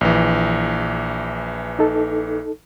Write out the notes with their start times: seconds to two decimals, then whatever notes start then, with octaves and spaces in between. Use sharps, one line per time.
0.01 A#1 E3
1.79 D#4 A4